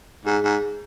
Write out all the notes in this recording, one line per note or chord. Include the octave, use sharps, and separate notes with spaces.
G#2 G#4
G#2